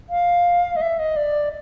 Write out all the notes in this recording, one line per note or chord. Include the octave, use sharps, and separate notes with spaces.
F5
D#5
E5
D#5
D5